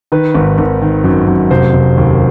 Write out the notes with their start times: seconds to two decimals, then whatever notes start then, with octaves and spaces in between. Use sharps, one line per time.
0.12 D#3 B4
0.35 G#1
0.58 G#1
0.82 D#3
1.04 F#2
1.27 F#2
1.50 F1 C5
1.73 F1
1.97 D#2